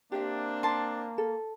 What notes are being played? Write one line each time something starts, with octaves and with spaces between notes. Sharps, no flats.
A#3 C4 D4 G4 E5
A5 C6
A4